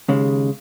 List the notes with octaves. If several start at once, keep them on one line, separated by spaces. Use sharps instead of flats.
D#2 C#3 G#3